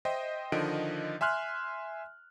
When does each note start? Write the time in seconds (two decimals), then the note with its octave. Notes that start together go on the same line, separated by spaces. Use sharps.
0.05 C5 D#5 E5 G5
0.52 D3 D#3 F3 D#5 D7
1.21 E5 G#5 C6 F6 F#6